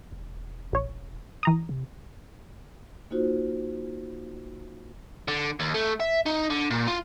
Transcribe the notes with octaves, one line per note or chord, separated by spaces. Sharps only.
E1
A#1 C#5
E3 A#5 D#6
C3
A#3 D#4 F4 F#4 C5
D3
D#2
A3
E5
D#4
D3
A#2
F4